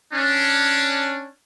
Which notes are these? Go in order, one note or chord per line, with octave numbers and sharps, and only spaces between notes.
C#4 D4